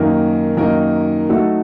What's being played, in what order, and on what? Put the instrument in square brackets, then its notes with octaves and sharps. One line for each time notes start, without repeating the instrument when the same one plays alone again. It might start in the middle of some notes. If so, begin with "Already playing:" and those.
Already playing: [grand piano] F#2 D#3 A#3 D#4 A#4
F#2 D#3 A#3 D#4 A#4
F#3 A3 D#4 F#4 A4